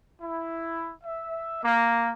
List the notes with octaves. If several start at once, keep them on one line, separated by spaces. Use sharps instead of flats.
E4
E5
A#3